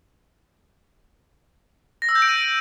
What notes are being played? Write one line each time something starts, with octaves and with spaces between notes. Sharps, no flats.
A#6
E6
G6
D7
D#7